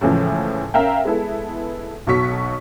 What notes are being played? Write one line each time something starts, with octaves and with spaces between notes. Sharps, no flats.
A2 C#3 E3 F3 G#3
C#4 A#4 E5 F5 G5
G#3 B3 E4 A4
B1 B2 F#3 C#6 B6